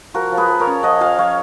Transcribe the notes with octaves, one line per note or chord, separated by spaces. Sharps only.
F3 F#4 A#4
F3
G#4 B4
F3
A#4 C#5
C#4
F3 D#5 F#5
F3 F5 G#5
F3 C#5 F5